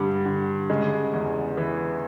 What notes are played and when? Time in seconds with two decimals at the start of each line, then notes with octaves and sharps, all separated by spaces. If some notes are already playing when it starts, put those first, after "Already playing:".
Already playing: G2 D3 G3
0.26 D3
0.70 C#3 G#3
1.13 E2
1.57 E3